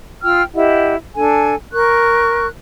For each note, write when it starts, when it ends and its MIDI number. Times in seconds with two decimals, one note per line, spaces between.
0.22 0.42 65
0.22 0.42 79
0.22 0.42 88
0.22 0.42 89
0.55 0.95 64
0.55 0.95 67
0.55 0.95 75
0.55 0.95 78
1.15 1.55 62
1.15 1.55 69
1.15 1.55 80
1.73 2.47 70
1.73 2.47 85
1.73 2.47 90